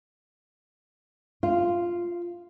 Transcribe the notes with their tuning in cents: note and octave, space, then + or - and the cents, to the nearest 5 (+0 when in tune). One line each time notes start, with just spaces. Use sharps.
F4 -5